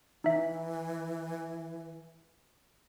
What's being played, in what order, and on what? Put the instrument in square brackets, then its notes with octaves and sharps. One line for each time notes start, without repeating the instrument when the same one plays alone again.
[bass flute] E3 [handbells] D#4 E5